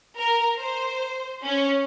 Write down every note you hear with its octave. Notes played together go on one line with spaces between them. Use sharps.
A#4
C5
C#4